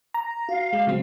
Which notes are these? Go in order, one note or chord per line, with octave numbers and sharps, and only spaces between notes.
A#5
F#4 F5
G#3
C#3 F#3 C4